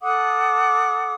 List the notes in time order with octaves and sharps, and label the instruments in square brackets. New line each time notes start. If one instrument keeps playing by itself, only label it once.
[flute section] A4 F#5 D6 D#6